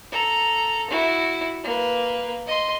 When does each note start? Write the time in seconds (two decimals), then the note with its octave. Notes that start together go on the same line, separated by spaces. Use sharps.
0.12 A4 A#5
0.90 E4 F#4
1.64 A#3 B4
2.47 D#5 C6